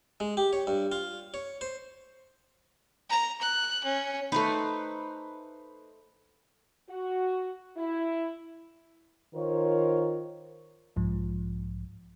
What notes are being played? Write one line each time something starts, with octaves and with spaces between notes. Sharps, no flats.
G#3
G4
C#5
G2
F4
C#5
C5
A#5
F#6
C#4
A3 D#4 B4 C5
F#4
E4
D#3 F4 A#4 C5 C#5
B1 G#2 F3